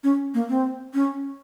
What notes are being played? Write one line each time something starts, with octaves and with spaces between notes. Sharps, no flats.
C#4
A#3
C4
C#4